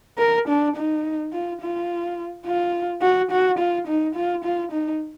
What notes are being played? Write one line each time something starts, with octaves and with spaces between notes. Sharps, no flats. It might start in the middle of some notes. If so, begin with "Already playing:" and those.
A#4
D4
D#4
F4
F4
F4
F#4
F#4
F4
D#4
F4
F4
D#4